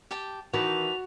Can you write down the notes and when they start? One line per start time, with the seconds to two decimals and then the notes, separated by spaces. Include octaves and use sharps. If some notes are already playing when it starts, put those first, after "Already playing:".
0.11 G4 G5 A5
0.53 D#3 E3 F#4 B4 D5 A5 F7